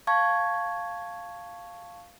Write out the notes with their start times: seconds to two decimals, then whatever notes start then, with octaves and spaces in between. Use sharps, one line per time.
0.07 F5 A5 C#6 G#6